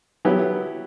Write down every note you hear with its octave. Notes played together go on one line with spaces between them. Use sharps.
F#3 B3 E4 G4